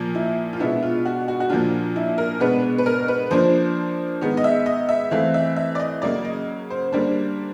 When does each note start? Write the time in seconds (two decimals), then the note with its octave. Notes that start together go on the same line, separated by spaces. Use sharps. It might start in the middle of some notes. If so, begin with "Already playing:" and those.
Already playing: A#2 F3 A#3
0.15 E4
0.53 F4
0.59 B2 G#3 B3 D4 E4
0.83 F4
1.05 F#4
1.28 F#4
1.40 F#4
1.50 A#2 F3 A#3 D4 F4
1.96 E4
2.18 A#4
2.40 B2 G#3 B3 D4 B4
2.78 B4
2.86 A#4
3.08 B4
3.31 F3 A#3 D4 C5
4.21 D#3 G#3 B3
4.37 D#5
4.44 E5
4.66 D#5
4.89 E5
5.11 E3 A3 C4 F5
5.34 E5
5.56 E5
5.75 D5
5.80 D#5
6.02 C#3 F#3 A#3 D5
6.25 D#5
6.70 C5
6.92 D3 G3 A#3 D4 C5